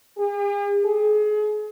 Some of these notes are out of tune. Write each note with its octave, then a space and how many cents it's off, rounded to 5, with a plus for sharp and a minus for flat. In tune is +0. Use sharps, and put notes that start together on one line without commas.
G#4 -45
G#4 +30